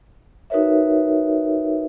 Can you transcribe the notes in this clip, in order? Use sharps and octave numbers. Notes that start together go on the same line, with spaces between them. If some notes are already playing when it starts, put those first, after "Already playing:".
D#4 F#4 A#4 B4 C#5 E5